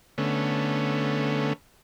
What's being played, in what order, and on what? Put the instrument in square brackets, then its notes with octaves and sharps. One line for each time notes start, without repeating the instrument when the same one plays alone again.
[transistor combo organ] D3 A3 B3 C#4